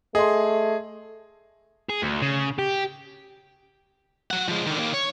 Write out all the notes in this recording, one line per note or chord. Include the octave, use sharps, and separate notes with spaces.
A3 G#4 D#5 C6
G#4
D2
C#3
G4
F#3 F#5
F3 G#3
D3 D#3
D#3 A#3
C#5